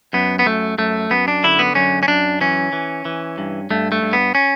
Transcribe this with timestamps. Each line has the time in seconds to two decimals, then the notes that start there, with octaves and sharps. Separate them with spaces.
0.13 F#2 B3
0.39 B3
0.46 F#2 A3
0.78 F#2 A3
1.10 F#2 B3
1.28 D4
1.44 D3 E4
1.59 B3
1.75 F#2 C#4
2.03 C#4
2.08 F#2 D4
2.41 E3 C#4
2.73 E3
3.05 E3
3.38 G2
3.70 G2 A3
3.92 A3
4.03 G2
4.13 B3
4.35 C#4